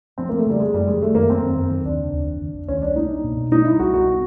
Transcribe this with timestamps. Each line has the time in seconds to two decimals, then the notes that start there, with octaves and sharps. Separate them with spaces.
0.18 F3 C4
0.29 F3 A#3
0.38 A3
0.46 C#3 G3
0.59 G#3 A3
0.74 F#2 G3
0.87 F3 G#3
1.01 D#3 A3
1.15 F#2 A#3
1.29 D#3 C4
1.43 F#2
1.57 F#2
1.70 D#3
1.85 D#2 D4
1.99 C#3
2.12 D#2
2.27 D#2
2.41 D#2
2.54 D#2
2.68 C2 C#4
2.82 G3 D4
2.96 A#3 D#4
3.10 A#3
3.24 B2
3.37 B2
3.52 G3 D#4
3.65 G3 E4
3.79 C2 F#4
3.93 B3 F#4
4.07 B3